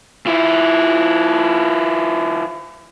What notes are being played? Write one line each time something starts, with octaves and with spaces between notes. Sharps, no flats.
F3 E4